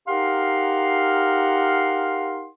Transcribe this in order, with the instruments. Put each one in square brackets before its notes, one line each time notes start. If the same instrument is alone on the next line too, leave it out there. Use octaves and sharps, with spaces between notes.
[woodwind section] D#4 G4 A#4 F5 F#5 C6